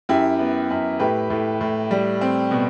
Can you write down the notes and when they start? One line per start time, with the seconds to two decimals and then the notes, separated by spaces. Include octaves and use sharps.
0.09 F#2 E4 G4
0.39 B3
0.70 F#2
0.99 A2 G4 B4
1.30 A2
1.61 A2
1.91 G3
2.21 C4
2.51 B2